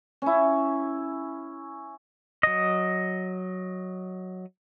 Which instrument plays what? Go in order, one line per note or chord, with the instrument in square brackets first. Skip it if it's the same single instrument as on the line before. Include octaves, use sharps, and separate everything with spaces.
[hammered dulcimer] C#4 E4
[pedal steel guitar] F#3 D#5